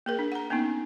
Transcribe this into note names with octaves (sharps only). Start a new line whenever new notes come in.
A#3 G#4 A#4
D4
F#5 A#5
A#3 B3 C#4 D#4